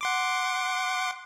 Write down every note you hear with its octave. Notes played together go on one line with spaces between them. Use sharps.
F#5 C6 D6